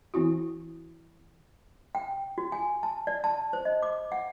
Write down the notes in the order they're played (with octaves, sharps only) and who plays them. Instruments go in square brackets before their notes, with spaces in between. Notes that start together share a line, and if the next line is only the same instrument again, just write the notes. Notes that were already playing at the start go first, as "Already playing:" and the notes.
[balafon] E3 C4 E4 F#4
[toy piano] G5
F#4
G#5
A5
D5
A5
C5
D#5
D6
F#5